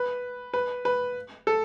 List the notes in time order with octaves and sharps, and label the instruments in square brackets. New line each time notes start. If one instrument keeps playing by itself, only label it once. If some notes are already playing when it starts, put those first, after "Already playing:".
Already playing: [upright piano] B4
B4
B4
A4